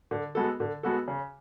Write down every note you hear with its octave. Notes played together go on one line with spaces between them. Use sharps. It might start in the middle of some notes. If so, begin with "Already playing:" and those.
D3
G#3 B3 F#4 A4
D3
G#3 B3 F#4 A4
C#3